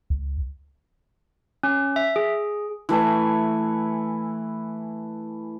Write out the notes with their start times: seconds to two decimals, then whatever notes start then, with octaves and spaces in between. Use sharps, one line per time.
0.10 C#2
1.63 C#4
1.96 E5
2.16 G#4
2.89 E3 A3 B4 G#5